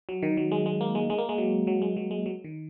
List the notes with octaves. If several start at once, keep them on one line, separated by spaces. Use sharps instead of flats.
F#3
D#3
F#3
G#3
G#3
A#3
G#3
G#3
A#3
G#3
F#3
F#3
G#3
F#3
G#3
F#3
D#3